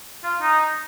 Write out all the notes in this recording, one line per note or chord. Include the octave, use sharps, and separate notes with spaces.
F4
D#4